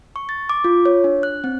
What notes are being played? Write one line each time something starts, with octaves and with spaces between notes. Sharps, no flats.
C#6
A6
D6
F4
C#5
D4
F#6
C4